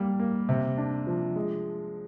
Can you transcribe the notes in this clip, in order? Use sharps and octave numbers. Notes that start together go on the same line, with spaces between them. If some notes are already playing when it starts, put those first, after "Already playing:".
Already playing: G3 A#3
A#3
C3
D4
F3
G#3